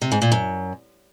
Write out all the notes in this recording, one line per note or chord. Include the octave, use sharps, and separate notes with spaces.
C3
G#2
A#2
F#2